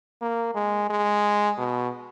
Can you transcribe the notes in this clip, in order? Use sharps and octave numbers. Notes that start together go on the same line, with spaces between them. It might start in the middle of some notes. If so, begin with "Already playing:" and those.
A#3
G#3
G#3
B2